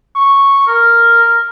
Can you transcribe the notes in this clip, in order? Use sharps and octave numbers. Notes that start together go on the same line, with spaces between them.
C#6
A#4